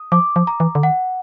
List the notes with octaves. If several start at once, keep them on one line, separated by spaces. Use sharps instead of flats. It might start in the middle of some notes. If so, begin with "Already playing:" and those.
Already playing: D#6
F3 D6
F3
A#5
E3
D3
D#3 F#5